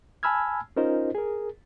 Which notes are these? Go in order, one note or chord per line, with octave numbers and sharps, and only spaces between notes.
G#5 A5 B5 E6 F6 G#6
C#4 D#4 F4 A#4 C5 D#5
G#4 A#4